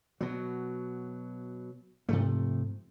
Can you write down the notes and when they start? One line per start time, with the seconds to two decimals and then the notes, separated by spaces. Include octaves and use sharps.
0.21 B2 F#3
2.09 G#2 C3 F3 A3